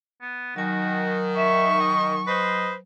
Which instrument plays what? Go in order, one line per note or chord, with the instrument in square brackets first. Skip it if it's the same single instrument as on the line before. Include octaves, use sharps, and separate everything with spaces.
[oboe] B3
[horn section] D#3 [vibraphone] F#3 G#5 [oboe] F#4
[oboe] E5 [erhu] C#6
[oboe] D#5
[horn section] B4 C5 [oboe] D#5